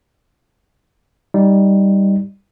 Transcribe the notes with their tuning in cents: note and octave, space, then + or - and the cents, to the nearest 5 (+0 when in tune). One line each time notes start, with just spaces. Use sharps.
G3 +0 D#4 +0 D#5 +0